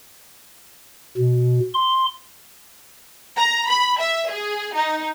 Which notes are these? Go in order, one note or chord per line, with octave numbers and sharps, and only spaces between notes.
B2
C6
A#5
B5
E5
G#4
D#4